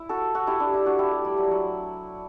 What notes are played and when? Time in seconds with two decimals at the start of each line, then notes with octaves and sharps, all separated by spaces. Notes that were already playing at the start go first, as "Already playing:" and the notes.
Already playing: E4
0.09 F#4 A4
0.35 F#4 A4
0.47 E4 G4
0.60 D4
0.73 E4
0.86 D4 F#4
0.98 E4 G4
1.12 A3
1.25 G3
1.37 F#3
1.51 F#3